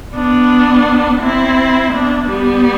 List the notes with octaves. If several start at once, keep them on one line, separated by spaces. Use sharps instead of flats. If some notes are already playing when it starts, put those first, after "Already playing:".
B3 D4
C4 E4
B3 D4
G3 B3